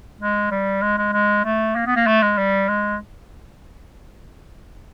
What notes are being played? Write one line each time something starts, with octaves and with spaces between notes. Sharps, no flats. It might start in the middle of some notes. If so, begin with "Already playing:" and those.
G#3
G3
G#3
G#3
G#3
A3
A#3
B3
A#3
A3
G#3
G3
G#3